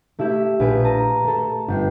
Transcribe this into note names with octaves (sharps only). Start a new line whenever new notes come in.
A3 E4 G4 E5
A#1 B4 G#5 D7
A5 A#5 D#7
A3 A4
G1 G5 C7